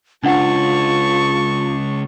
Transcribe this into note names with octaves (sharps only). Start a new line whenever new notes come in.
C#2 D4 F4 F#5 A5 C#6